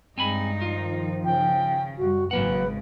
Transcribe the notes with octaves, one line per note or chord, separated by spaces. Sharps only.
G2 G#3 C4 D#4 G#5 B5
D#3 F3 F4
C#3 G5
F#2 G3 F#4
G#1 C#3 F#3 G#3 A#3 B4 F#5